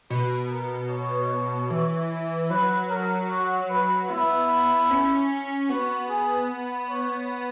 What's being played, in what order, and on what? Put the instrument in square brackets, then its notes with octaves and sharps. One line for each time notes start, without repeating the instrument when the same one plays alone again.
[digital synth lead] B2 [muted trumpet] B4
[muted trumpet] A#4
C#5
[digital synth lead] E3
[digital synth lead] F#3 [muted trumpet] B4
[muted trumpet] A#4
F#4
B4
[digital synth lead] B3 [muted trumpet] E4
[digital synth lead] C#4
[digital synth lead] B3 [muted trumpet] F#4
[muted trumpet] G#4
C#5